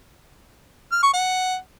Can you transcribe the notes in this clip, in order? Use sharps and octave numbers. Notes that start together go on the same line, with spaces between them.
F6
C#6
F#5